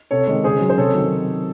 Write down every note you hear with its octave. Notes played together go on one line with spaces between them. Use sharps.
C3 A4 C#5
D#3 G#3
C#3 G#4 C5
F#3
C5
C3 A4 C#5
D#3 F#3